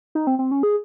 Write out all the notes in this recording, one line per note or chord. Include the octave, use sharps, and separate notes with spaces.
D#4
C4
C4
C#4
G#4